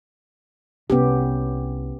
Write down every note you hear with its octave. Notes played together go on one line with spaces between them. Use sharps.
C2 B3 C#4 G4